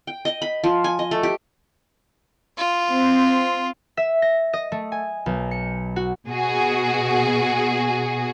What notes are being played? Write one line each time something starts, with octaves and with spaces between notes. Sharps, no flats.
G5
D#5
B5
F3
G#5
D#5
A3
G4
F4
C4
E5
A#6
D#5
A3
G#5
B1
C#7
F#4
B2 F#4 G#4